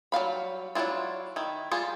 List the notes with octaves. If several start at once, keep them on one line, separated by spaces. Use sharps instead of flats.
F#3 G3 F5 B5
F#3 C4 D4 E4 F4
D#3 E4
G3 F4 G#4 A4